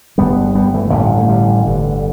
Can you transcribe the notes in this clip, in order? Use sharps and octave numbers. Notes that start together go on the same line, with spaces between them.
G1 G2 D3 G3 B3
G3 B3
E3 A3
A1 A2 D3 G3
D3 G3
G1 G2 D3